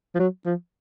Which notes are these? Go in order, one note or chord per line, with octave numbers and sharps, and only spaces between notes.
F3
F#3
F3